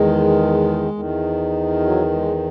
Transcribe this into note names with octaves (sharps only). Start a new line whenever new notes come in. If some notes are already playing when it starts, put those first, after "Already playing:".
Already playing: E2 D#3 G#3
E2 D#3
F#3
G#3